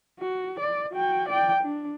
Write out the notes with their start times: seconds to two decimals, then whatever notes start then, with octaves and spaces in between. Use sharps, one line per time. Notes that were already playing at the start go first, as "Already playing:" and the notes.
0.20 F#4
0.60 D5
0.93 F#4 G5
1.29 D5 G5
1.63 D4